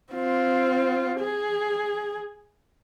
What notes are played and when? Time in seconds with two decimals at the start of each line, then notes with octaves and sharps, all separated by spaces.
0.13 C4 F4
1.20 G#4